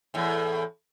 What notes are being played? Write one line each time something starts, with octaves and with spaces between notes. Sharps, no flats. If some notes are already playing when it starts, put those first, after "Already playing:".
E2 A2